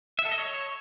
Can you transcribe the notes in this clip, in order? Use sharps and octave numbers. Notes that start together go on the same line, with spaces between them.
E5
A4
D#5
C#5